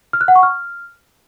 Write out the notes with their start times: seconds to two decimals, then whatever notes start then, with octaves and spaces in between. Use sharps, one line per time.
0.13 F6
0.21 F#6
0.28 F#5
0.36 C#6
0.43 F6